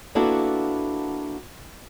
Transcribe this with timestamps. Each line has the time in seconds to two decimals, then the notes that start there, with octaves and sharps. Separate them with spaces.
0.15 A#3 B3 D4 E4 F#4 A4